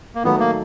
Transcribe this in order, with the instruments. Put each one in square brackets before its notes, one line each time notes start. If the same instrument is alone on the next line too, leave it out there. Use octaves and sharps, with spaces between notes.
[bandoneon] A#3
[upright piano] D#3 F#3 A3 [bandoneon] B3
[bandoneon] A#3